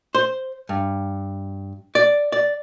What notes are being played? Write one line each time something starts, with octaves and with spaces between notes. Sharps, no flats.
C5
G2
D5
D5